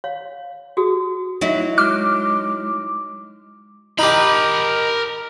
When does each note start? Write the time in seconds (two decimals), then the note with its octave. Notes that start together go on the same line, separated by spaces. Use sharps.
0.04 C#5 F5
0.77 F#4 G#4 D#6
1.41 F#3 D#4 E4
1.78 G#3 D6 F6
3.99 D#4 G4 A#4 B5